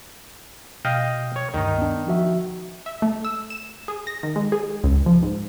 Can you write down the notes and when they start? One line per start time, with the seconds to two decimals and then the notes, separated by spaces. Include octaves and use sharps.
0.85 B2 D#5 F5 G5
1.36 C#5
1.54 D2 G2 D#3 D#4
1.78 B3 D4
2.07 F3 F#4 E5
2.86 E5
3.02 A3
3.25 E6
3.50 E7
3.88 G#4
4.07 A#6
4.23 D#3
4.36 G#3
4.52 G#4
4.84 C#2
5.06 F3
5.22 G#2